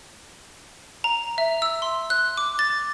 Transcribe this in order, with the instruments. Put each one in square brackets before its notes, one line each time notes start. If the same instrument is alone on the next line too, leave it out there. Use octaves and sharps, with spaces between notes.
[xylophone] A#5
E5
E6
C6
F#6
D6
A6